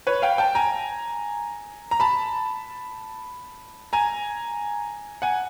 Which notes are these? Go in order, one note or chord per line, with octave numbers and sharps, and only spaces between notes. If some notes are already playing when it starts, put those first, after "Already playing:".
B4 C#5
F5 G5
G5 A5
G#5 A#5
A#5
A5 B5
G#5 A#5
F#5 G#5